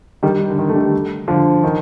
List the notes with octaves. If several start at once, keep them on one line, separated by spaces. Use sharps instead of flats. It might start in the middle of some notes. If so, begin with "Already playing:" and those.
D#3 G3
D3
D#3
A3
D#3 G3
D3 F3
D#3